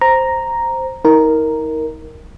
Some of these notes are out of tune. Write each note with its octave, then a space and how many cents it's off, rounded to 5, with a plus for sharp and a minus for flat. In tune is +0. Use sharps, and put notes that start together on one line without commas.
C5 +0 A#5 +0
D#4 +40 A#4 +0